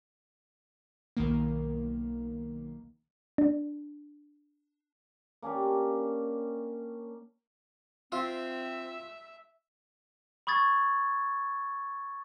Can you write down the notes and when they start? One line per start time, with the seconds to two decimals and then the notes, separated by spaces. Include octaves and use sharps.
1.17 B1 D#3 A#3
3.38 D4
5.42 A#3 C#4 D4 G4
8.12 C4 F4 E5
10.47 B5 C#6 D#6 G#6 A6